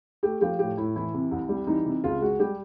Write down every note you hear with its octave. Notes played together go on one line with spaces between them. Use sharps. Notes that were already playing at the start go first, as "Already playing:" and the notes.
A3 G4
F3 G4
A2 G4
A2 E4
E3 E4
C3
C2
G3
E3 D#4
C3
C#2 F4
G#3 F#4
G3 G4